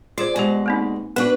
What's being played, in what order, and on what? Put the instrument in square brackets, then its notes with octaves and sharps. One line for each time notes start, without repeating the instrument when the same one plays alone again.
[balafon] F4 G#4 C5 [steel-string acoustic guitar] D5
[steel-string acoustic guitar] B2 G#3 [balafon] G4 C5 G#5
[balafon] A#3 C4 D#4
[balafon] B3 F#4 [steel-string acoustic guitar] D4 B4